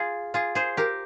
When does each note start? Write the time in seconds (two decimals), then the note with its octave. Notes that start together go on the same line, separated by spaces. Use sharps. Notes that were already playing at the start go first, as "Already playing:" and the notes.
Already playing: F4 G#4
0.34 F4 G#4
0.55 G#4 C5
0.77 G4 A#4